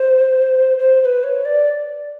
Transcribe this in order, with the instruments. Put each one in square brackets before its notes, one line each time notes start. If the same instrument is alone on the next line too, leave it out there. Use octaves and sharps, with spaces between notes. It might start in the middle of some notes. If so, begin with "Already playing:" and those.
Already playing: [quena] C5
C5
C5
B4
C#5
D5